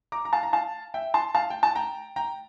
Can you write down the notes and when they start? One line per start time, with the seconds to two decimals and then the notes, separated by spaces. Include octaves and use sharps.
0.12 A#5 D6
0.25 A#5
0.33 F5 A5
0.43 A#5
0.53 F5 A5
0.94 E5 G5
1.14 A5 C6
1.35 F5 A5
1.50 G5
1.63 A5
1.75 G5 A#5
2.16 G5 A#5